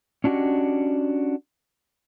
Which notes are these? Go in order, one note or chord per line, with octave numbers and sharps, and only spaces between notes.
C#4 D4 E4 F#4 G4 D#5